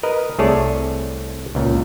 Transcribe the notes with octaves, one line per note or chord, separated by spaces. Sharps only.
A#4 B4 D#5
C2 A3 G#4 C#5 D5 A5
C#2 A#2